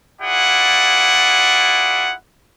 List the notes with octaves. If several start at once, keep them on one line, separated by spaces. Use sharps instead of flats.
E4 F4 G#4 D5 F#5